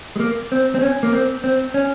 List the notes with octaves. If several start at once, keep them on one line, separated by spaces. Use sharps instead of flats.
G#3
A#3
C4
C4
C#4
A#3
C4
C4
C#4